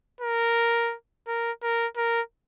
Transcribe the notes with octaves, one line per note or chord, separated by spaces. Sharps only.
A#4
A#4
A#4
A#4